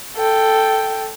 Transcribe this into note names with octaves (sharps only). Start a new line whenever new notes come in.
A4 G5